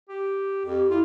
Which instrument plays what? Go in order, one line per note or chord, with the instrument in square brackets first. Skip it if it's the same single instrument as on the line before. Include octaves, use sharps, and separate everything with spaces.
[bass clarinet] G4
[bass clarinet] F2 [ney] G4
[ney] E4 [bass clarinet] F4